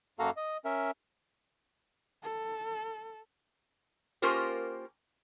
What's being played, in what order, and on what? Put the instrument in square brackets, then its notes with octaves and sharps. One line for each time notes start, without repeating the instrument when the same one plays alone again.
[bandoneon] F#2 A#3 F#4 A4 F5 A#5
D#5
C#4 A#4 E5
[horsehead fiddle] A4
[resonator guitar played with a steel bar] A#3 C#4 F4 G4 A#4 C5